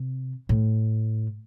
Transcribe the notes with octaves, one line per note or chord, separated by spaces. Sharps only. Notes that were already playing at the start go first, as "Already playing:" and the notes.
Already playing: C3
A2